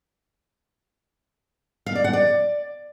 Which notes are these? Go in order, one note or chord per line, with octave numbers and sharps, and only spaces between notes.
F5
D5
F#5
D5